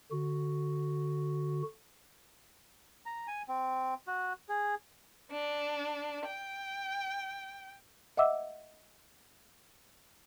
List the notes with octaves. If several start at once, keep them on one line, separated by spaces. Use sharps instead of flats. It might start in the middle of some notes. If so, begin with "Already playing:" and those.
D3 F#4
A#5
G#5
C4
F#4
G#4
D4
G5
D#5 E5 F#5 D6 E6